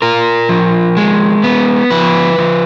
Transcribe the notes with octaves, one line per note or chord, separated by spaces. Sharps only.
F4 A#4
F3
G#3
B3
F3 B4
F3